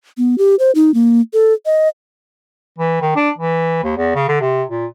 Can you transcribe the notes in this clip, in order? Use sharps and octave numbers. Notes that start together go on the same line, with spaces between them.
B3
G4
C5
D#4
A#3
A4
D#5
E3
D#3
D4
E3
D#2
E2
C#3
D3
C3
A#2